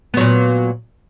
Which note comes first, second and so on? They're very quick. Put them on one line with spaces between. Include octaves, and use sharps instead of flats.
B3 F#3 A#2